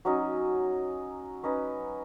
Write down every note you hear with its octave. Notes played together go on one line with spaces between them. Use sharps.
F#3 C#4 D#4
C#4 D#4 B4